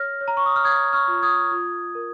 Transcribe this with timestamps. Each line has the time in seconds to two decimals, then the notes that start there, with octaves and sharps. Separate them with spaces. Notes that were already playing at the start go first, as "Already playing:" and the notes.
Already playing: C#5 F6 A#6
0.21 C#5
0.28 A#5
0.37 C#6
0.46 D#6
0.56 F6
0.64 C#5 D#6 G#6
0.93 C#6 F6
1.08 F4
1.22 D#6 G#6
1.51 F4
1.95 A#4